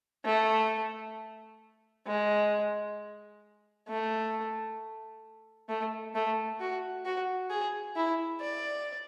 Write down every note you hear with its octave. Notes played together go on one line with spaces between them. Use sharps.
A3
G#3
A3
A3
A3
F#4
F#4
G#4
E4
D5